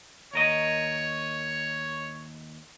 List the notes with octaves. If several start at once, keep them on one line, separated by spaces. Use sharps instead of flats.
D#2 A#4 C#5 D#5